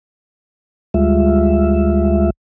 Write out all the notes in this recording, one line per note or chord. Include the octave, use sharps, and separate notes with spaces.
D2 G3 G#3 F4 E5